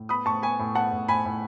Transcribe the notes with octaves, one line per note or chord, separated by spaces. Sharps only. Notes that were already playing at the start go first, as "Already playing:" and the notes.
Already playing: A2
B3 B5 D#6
A2 A5 C#6
B3 G#5 B5
A2
B3 F#5 A5
A2
A2 G#5 B5
A2